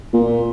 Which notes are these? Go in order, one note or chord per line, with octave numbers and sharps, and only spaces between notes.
A#2